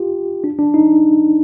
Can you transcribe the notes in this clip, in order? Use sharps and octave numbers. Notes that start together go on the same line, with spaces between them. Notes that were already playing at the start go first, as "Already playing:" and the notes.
Already playing: F4 G4
D4
D4
D#4